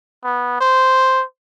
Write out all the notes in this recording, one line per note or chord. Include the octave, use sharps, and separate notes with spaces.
B3
C5